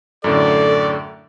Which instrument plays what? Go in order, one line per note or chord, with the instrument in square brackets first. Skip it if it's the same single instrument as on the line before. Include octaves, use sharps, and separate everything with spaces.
[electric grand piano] F#2 A2 D3 [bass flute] A4 [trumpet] D5